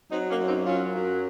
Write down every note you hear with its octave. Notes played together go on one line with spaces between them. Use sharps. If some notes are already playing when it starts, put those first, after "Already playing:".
F#3 C4 D#4
A#3 C#4
F#2
C4 D#4
F#3 C#4 F4
F#2